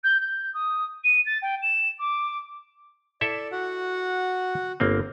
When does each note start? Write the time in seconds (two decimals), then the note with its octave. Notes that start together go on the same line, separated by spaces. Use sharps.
0.03 G6
0.19 G6
0.54 D#6
1.04 D#7
1.25 A6
1.42 G5
1.62 E7
1.98 D6
3.21 E4 A4 D5 E5
3.52 F#4 F#5
4.80 G1 A#3 C4